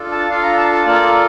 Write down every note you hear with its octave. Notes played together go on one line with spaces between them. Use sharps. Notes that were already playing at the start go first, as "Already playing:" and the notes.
Already playing: D4 F4 A4
A5
D4 F4 A4 F5
A#5
A5
A5
A#3 F4 A4 D5